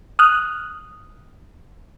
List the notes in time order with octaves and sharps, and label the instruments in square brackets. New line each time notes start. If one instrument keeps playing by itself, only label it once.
[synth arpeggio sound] D#6 F6 F#6